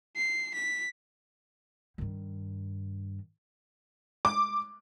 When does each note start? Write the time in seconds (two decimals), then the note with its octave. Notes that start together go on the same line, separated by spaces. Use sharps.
0.17 C7
0.55 B6
1.98 G2 D#3
4.25 D6